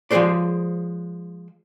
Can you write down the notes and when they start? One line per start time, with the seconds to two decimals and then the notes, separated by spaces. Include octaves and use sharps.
0.11 F3 G#3 F#4 G#4 C5 D5